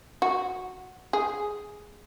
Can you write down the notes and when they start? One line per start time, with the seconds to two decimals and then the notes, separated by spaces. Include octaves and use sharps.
0.22 F#4
1.13 G#4